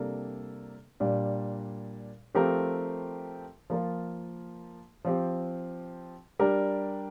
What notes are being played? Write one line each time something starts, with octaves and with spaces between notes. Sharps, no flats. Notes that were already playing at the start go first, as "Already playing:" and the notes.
Already playing: C3 G3 A#3 D4 A4
A#2 G3 D4
F3 A3 C4 G4 A#4
F3 A#3 F4 A#4
F3 C4 G4
G3 D4 G4 A#4